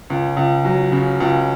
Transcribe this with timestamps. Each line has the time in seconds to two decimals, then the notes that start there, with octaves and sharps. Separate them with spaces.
0.10 C#2
0.37 C#2
0.65 F#3
0.92 C#3
1.20 C#2